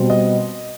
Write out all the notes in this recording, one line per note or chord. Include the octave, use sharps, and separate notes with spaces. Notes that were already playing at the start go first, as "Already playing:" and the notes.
Already playing: B2 G3 C4
D#5